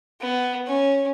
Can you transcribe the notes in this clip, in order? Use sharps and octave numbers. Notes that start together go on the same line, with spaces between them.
B3
C#4